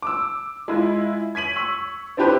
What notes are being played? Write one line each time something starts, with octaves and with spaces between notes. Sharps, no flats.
D6 E6
G#3 E4 F4
G#6 B6 D#7 F#7
C#6 E6 F#7
C4 D4 E4 G4 B4 C5